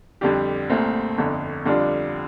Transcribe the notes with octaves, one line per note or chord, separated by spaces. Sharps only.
F2 D3 G3 D4 G4
C2 A#2 A3 C4
G1 F2 D3
F2 D3 G3 D4 F4